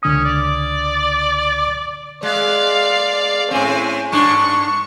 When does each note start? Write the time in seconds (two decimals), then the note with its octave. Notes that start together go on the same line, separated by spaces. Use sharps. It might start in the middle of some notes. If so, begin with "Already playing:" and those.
0.03 C#2 D3 C#4 D#6
0.25 D5
2.23 G#3 D5 F5
3.51 A2 C4 C#4 G#5
4.12 G2 D4 C#6